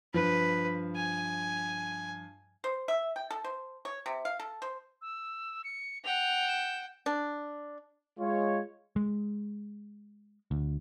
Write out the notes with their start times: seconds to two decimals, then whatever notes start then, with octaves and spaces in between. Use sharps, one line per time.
0.14 G2 F3 B4
0.96 G#5
2.64 C5
2.88 E5
3.16 G5
3.31 A4
3.44 C5
3.85 C#5
4.06 C3
4.25 F5
4.40 A4
4.62 C5
5.02 E6
5.64 C#7
6.04 F#5 G5 F7
6.48 E7
7.06 D4
8.19 G#3 F4 C#5
8.96 G#3
10.51 D2